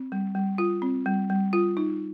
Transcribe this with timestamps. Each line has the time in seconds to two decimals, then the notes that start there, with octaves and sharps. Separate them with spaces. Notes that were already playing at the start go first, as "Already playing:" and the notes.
Already playing: C4
0.12 G3
0.35 G3
0.58 F4
0.82 C4
1.06 G3
1.30 G3
1.53 F4
1.77 D#4